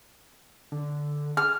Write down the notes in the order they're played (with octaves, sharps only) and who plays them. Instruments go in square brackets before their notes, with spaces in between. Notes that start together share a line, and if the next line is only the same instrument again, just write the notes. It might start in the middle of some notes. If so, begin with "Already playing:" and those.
[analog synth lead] D3
[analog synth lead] G#4 [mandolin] F6